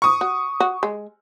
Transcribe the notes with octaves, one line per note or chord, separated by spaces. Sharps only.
C#6 D#6
F#4
F#4
G#3